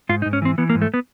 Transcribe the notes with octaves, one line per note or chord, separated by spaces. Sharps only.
G#2 F4
D#4
G#2
C#4
E3 C4
E3 B3
A#3
G#2
A3
B3